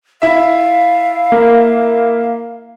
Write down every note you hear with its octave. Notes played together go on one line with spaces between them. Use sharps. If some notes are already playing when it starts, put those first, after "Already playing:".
E4 E5 F5
A#3 A#4